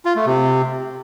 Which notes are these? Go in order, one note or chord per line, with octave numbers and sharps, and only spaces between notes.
F4
A3
C3